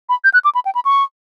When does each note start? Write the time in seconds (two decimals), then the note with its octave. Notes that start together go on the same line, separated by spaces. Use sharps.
0.09 B5
0.24 G6
0.34 F#6
0.44 D6
0.55 B5
0.65 G5
0.75 B5
0.85 C#6